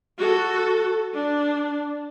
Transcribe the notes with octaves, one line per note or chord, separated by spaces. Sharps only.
F#4 A4
D4